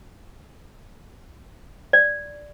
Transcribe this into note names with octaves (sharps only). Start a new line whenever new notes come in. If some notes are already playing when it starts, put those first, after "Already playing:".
D5